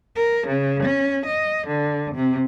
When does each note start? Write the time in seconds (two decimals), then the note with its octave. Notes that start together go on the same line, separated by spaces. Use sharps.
0.16 A#4
0.47 C#3
0.83 C#4
1.26 D#5
1.67 D3
2.15 C3